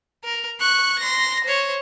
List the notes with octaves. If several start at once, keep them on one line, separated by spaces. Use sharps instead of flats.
A#4
C#6 F#6
C6 A#6
C5 C#5